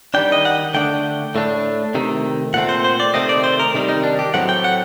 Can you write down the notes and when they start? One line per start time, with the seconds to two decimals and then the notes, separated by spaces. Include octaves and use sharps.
0.14 D#3 G3 D4 G5
0.32 D#5
0.45 F#5
0.74 D3 A3 D4 G5
1.35 A2 A3 D4
1.95 C3 D#3 A3
2.54 A#2 A3 C4 F#5
2.69 C5
2.84 C5
3.00 D5
3.14 C3 D#3 A3 C4 D#5
3.29 D5
3.44 C5
3.59 A#4
3.74 C3 D#3 G3
3.89 D#4
4.03 D4
4.19 G4
4.34 A2 F#3 A3 C4 F#5
4.49 G5
4.64 F#5